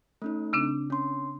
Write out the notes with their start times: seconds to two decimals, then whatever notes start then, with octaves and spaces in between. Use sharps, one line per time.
0.22 A3 C#4 D#4
0.53 C#3 C4 D4
0.90 C#4 C6